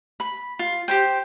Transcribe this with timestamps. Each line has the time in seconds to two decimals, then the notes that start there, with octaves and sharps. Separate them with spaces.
0.20 B5
0.59 F4
0.88 G4 C5 G5